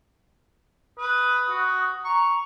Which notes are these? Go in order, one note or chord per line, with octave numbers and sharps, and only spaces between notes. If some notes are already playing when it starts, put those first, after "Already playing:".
B4 D#6
F#4
A#5 C#6